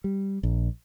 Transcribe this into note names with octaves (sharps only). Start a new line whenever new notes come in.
G3
A#1